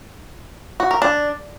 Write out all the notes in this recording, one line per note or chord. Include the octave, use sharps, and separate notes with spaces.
F#4
A#4
D4